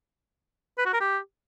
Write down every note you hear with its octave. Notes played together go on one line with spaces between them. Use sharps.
B4
F#4
A#4
G4